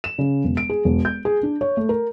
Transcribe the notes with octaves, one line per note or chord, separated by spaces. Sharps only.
E7
C#3
E1
D7
G#4
E1
G6
G#4
D4
C#5
A3
A#4